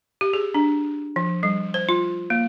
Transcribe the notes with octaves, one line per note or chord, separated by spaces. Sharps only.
G4
G#4
D4
F3
G3
C5
F4
A#3